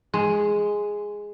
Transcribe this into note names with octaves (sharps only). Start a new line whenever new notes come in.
G#3